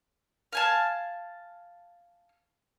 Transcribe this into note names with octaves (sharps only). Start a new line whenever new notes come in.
F5 G#5 A5